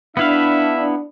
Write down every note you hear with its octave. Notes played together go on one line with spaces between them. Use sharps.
B3 D4 E4 E5 F5